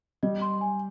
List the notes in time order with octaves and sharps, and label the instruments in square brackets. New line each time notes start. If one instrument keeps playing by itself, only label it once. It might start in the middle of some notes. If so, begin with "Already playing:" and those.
[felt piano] G3 [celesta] D#5
[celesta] C6
G#5